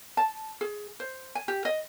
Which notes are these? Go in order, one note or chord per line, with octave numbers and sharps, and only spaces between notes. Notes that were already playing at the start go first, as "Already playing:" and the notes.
A5
G#4
C5
G#5
G4
D#5